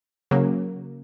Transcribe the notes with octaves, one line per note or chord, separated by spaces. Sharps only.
C#3 F#3 A#3